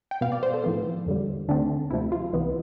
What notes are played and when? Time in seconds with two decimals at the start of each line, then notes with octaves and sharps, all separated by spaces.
0.11 G5
0.21 B2 B3 F5
0.32 D5
0.43 C5
0.54 A4
0.64 A2 F3 B3
1.06 E2 D3 G3
1.48 D2 D3 A3 C4 D4
1.91 D2 C3 F3 A3 E4
2.12 F4
2.32 C2 C3 E3 B3